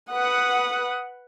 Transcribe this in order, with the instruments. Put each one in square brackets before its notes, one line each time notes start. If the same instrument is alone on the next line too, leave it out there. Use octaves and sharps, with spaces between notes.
[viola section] B4 F#5 [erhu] D#6